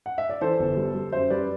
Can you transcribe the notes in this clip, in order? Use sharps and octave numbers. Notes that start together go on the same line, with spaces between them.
F#5
E5
D5
E3 A4 C5
G1
G3
G3
F#2 C5 E5
G3 B4 D5